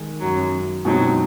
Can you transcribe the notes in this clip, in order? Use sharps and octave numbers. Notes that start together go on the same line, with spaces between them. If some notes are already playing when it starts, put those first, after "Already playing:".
Already playing: D#3 G#3
F#2 F#3
F#2 B2 F#3 G#3 C4 D#4